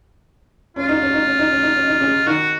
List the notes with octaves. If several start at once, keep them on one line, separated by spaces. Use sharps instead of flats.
C#4 F4
D#4
C#4
D#4
C#4
D#4
C#4
D#4
C#4
D#4
C#3 C#4
D#3 D#4 F#4